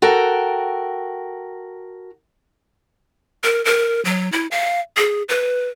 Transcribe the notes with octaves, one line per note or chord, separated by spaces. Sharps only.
F#4 A4 A#4 G5
A#4
A#4
F#3
E4
F5
G#4
B4